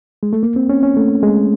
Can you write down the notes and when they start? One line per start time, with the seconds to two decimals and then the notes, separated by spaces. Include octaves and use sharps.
0.23 G#3
0.33 A3
0.43 A#3
0.56 C4
0.69 C#4
0.83 C#4
0.97 A3
1.23 G#3